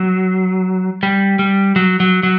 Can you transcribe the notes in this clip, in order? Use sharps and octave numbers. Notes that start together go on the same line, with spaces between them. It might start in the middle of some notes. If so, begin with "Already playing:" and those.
Already playing: F#3
G3
G3
F#3
F#3
F#3